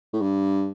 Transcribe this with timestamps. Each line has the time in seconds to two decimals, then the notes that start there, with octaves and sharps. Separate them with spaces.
0.13 A2
0.21 G2